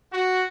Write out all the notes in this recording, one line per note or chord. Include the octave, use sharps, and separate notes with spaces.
F#4